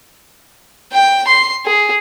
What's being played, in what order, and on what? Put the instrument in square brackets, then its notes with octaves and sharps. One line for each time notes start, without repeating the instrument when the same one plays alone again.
[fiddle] G5
C6
G#4